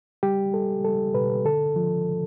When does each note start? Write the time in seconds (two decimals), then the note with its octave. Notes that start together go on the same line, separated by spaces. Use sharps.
0.23 G3 G4
0.53 G3 A4
0.84 G3 A4
1.14 B2 B4
1.45 D3 A4
1.76 F3